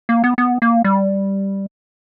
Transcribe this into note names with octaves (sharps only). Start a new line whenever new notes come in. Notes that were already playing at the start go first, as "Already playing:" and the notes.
A#3
B3
B3
A#3
G3